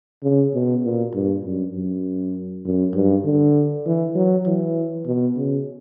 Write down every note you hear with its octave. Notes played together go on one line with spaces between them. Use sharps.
C#3
B2
A#2
G2
F#2
F#2
F#2
G2
D3
E3
F#3
E3
B2
C#3